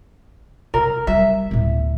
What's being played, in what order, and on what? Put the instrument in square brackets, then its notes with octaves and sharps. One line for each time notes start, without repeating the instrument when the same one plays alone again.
[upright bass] C3 [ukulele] A#4
[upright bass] G3 [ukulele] E5
[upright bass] D2 A2